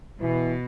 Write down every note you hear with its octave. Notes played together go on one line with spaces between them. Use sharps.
B2 E3